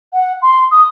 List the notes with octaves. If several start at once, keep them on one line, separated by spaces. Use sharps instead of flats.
F#5
C6
D#6